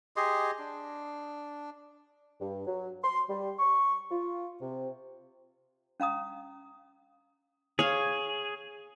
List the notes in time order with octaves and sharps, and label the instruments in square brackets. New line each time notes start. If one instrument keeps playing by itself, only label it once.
[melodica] G4 G#4 D#5 C6
D4
[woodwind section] G2
F#3
C6
G3
C#6
F4
C3
[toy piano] C#4 F5 A#5 D#6
[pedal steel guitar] G#4 [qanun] C#5 F5